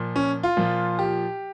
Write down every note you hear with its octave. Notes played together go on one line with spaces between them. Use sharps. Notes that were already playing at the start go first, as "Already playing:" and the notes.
Already playing: A#2 F3
C#4
F4
A#2 F3
G4